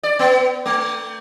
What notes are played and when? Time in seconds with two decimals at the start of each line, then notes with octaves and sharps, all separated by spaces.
0.03 D5
0.19 B3
0.66 A3